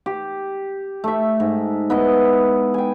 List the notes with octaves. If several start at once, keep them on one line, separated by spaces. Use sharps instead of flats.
G4
A3 E5
G#2
B3 E4 D#5
G5 G#5